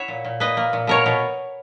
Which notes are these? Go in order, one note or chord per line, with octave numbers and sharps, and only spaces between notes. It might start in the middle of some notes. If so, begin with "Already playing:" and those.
Already playing: E4 C#5 E5 F#5
A#2
A#2
A#2 B4 D#5
A#3
A#2
B2 A#4 C#5
B2